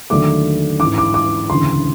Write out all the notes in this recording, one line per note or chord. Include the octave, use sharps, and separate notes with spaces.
D#2 D3 F#3 A3 D6
A1 G#2 E3 D6
D6
D6
E1 D2 C#3 E3 C6